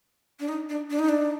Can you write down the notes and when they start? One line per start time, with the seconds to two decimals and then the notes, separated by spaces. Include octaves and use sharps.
0.40 D4
0.49 D#4
0.69 D4
0.91 D4
0.99 D#4
1.09 D4